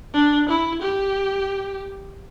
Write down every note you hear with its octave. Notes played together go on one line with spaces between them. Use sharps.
D4
E4
G4